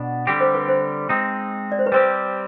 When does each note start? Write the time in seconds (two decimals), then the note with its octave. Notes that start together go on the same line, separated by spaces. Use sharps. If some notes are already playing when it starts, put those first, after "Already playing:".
Already playing: B2 B3 D4
0.27 D3 G3 C4 G4
0.40 C5
0.55 B4
0.68 C5
1.09 G#3 C4 D#4
1.72 D5
1.79 C5
1.86 B4
1.92 G3 C4 G4 C5